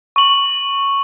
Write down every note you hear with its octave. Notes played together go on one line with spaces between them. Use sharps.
C#6 F#7